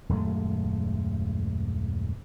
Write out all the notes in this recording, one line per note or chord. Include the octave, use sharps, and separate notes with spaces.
D#1 F#2 G#3 A3